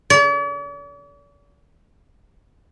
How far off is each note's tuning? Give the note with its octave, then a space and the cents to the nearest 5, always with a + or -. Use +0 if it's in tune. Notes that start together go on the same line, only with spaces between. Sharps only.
D5 -45